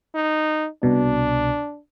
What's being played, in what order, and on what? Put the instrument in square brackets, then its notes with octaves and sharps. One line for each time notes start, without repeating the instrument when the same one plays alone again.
[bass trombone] D#4
[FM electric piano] C2 B2 [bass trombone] D4